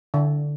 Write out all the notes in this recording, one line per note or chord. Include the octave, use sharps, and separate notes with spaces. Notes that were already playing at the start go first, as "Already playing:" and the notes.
D3